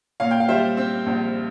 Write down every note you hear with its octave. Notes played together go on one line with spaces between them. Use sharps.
A#2 C#5 F5
G5
F5
G3 C5 E5
C4
A#1